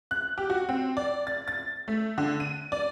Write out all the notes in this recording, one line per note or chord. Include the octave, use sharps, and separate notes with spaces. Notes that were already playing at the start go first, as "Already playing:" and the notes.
F#6
G4
F#4
C4
D5
A6
A6
A3
D3
D#7
D5